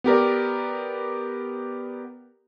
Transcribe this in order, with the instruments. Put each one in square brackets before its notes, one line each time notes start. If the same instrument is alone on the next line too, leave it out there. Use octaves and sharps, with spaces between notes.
[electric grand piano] B3 G4 A#4 D5